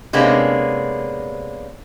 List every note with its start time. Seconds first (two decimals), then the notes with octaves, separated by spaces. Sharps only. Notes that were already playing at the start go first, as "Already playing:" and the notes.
0.13 C3 G#3 A#3 B3 C#4 D4